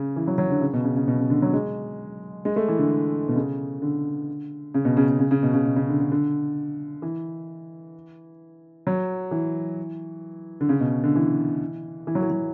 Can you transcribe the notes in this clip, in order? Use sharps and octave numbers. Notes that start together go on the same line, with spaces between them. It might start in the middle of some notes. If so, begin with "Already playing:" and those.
Already playing: C#3
E3
F#3
F#3
D3
C#3
B2
C#3
C#3
B2
C#3
D3
F#3
G#3
G#3
A3
E3
D3
B2
C#3
D3
C#3
B2
C#3
C#3
C#3
C#3
B2
C#3
B2
C#3
D3
D3
D3
E3
F#3
E3
D3
C#3
B2
D3
E3
E3
F#3
E3
F#3